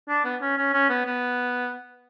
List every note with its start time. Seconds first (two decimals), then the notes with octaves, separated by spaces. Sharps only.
0.09 D4
0.25 B3
0.42 C#4
0.58 C#4
0.74 C#4
0.90 B3
1.06 B3